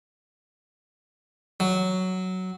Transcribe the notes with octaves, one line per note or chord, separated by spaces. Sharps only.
F#3